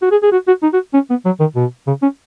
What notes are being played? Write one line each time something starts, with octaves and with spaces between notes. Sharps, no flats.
F#4
G#4
G#4
F#4
F#4
D#4
F#4
C#4
B3
F#3
D#3
B2
C#3
C#4